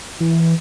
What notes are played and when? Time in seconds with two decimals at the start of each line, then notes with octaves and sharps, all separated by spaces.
0.20 E3